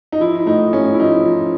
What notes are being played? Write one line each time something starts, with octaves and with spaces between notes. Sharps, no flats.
D#4
F3 E4
A2 D#4
A2 C#4
E4
F3 D#4
F3